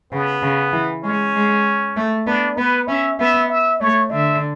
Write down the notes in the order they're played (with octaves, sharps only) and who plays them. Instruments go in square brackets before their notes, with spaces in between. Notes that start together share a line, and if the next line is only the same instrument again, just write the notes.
[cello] C#3 [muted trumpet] B3
[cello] C#3
E3
[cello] G#3 [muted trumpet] C#4
[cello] G#3
A3
[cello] B3 [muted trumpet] D4
[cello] B3 [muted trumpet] B4
[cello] C#4 [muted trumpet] E5
[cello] B3 [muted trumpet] E5
[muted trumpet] E5
[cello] A3 [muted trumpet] C#5
[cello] D3 [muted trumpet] E5